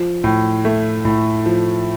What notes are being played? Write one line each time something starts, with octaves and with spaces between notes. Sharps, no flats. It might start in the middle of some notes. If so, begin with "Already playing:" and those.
Already playing: F3
A2
A3
A2
F3